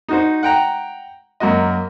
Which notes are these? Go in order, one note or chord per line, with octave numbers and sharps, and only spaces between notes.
D#4 F#4 C5
F#5 G5 A#5
F#2 A#3 F#4 D#5